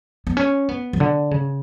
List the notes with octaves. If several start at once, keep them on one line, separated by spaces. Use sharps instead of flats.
B3
C#4
B3
C#3
D3
C#3